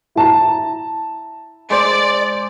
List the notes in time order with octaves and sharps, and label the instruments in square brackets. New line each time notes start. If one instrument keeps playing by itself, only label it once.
[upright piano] E4 A5 A#5
[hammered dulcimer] G#3 C5 [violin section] D5